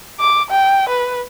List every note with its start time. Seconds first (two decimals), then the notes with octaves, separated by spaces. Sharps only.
0.20 D6
0.50 G5
0.89 B4